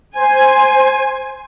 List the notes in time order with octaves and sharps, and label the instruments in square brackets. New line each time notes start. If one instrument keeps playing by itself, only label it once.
[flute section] C5 [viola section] G#5